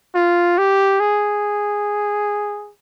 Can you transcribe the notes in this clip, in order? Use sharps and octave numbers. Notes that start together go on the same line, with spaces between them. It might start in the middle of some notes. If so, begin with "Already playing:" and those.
F4
G4
G#4